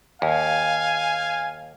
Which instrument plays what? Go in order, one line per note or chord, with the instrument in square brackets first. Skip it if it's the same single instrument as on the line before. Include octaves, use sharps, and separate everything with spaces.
[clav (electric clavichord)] D#2 [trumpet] F5 [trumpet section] G#5